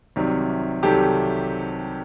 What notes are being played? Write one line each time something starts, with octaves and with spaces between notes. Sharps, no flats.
C2 C3 D#3 F#3
C2 C3 D#3 F#3 G4 A4